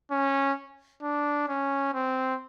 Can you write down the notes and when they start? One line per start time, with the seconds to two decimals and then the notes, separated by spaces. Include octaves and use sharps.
0.11 C#4
1.03 D4
1.49 C#4
1.94 C4